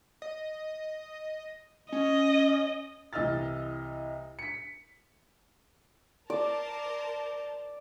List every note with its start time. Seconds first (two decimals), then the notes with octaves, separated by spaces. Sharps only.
0.22 D#5
1.92 C#4 D#5
3.13 C2 E3 D#5 E6 F6 A6
4.39 B6 C#7
6.30 A#4 C5 D5 A5